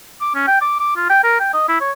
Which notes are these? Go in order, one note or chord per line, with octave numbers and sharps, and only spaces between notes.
D6
C#4
G5
D6
D6
F4
G5
A#4
G5
D#5
E4
C#5